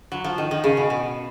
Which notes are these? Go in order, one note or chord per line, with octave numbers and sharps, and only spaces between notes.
F#3
F3
D#3
D#3
C#3
B2
B2